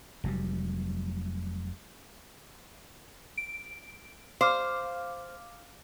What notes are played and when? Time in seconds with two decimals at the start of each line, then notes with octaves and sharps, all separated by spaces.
0.24 F1 F#3 G3
3.37 D7
4.41 C5 F5 D6 F6